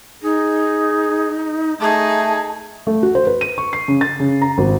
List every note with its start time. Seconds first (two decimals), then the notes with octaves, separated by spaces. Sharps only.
0.23 D#4 G#4
1.81 A3 D#4 G#4 A5
2.87 A3
3.03 F#4
3.15 C5
3.27 B4
3.41 D#7
3.58 C#6
3.73 C7
3.88 C#3
4.01 A6
4.20 C#3
4.42 A#5
4.58 G#1